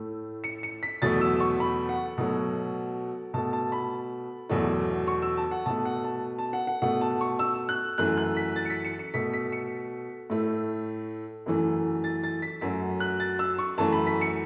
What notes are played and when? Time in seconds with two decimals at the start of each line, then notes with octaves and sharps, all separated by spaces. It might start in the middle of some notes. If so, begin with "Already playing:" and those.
Already playing: A2 A3
0.44 C#7
0.63 C#7
0.83 B6
1.02 E2 B2 F#3 A3 A6
1.21 E6
1.40 C#6
1.60 B5
1.89 F#5
2.18 B2 F#3 A3
3.34 B2 A3 A5
3.53 A5
3.72 B5
4.50 E2 B2 F#3 A3
5.08 C#6
5.22 E6
5.37 A5
5.51 F#5
5.66 B2 A3 A5
5.85 F#5
6.04 A5
6.39 A5
6.53 F#5
6.67 F#5
6.82 B2 A3 F#5
7.01 A5
7.21 C#6
7.39 E6
7.69 F#6
7.98 F#2 E3 A3 F#6
8.18 F#6
8.37 B6
8.56 A6
8.65 C#7
8.70 B6
8.85 C#7
8.99 C#7
9.14 B2 A3 B6
9.33 B6
9.52 C#7
10.30 A2 A3
11.46 F#2 E3 A3
12.04 A6
12.24 A6
12.42 B6
12.61 F#2 F#3 A3 B6
13.00 F#6
13.20 A6
13.39 E6
13.59 C#6
13.78 F#2 E3 A3 A5
13.92 B5
14.07 B6
14.21 C#7